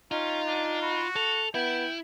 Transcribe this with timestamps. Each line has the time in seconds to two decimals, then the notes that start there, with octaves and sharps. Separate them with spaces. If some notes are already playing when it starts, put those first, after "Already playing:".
0.11 C#4 D#4 F4
0.47 D4
0.82 F#4 B5
1.16 A4 F7
1.54 B3 E4 G5 F#7